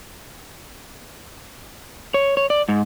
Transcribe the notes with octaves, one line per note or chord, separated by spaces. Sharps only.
C#5
C#5
D5
G#2